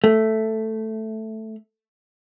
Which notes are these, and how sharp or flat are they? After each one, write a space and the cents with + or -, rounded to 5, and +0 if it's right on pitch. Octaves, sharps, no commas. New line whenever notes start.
A3 +0